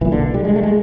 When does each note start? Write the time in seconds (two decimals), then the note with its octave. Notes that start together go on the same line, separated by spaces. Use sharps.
0.01 B1 A#2 E3
0.12 D3
0.34 G3
0.45 G#3
0.56 A3
0.63 G#3